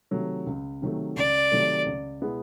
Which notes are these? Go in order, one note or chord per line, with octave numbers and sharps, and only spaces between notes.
C3 D#3 F#3 A3
C#2
C3 D#3 F#3 A3
C#2 D5
C3 D#3 F#3 A3
C#2
B2 G#3 B3 E4